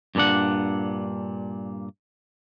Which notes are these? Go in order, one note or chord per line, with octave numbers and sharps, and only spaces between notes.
G2 A#2 D#3 D4 F#5